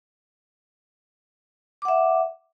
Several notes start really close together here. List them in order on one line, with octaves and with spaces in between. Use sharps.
D6 F#5 E5